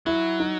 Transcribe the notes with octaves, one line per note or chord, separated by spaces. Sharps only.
F#3 E4
D#4